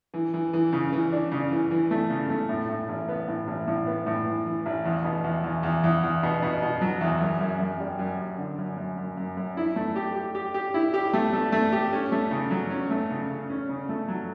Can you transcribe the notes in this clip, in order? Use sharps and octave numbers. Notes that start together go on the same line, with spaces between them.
E3
E3
E3
C#3
E3
D4
C#3
E3
E3
A3
C#3
A3
A2
A2
A1
B3
A2
A1
A2
B3
A2
E3
E3
A1
E2
B2
E2
E2
E2
E2
E2
B2
B2
B2
F#3
E2
F#2
F#2
F#2
G3
F#2
F#2
D3
F#2
F#2
F#2
F#2
F#2
E4
A3
G4
G4
G4
G4
E4
G4
A3
A3
A3
G4
C#4
A3
C#3
F#3
C#4
A3
C#3
C#3
C#4
C#3
A3
F#3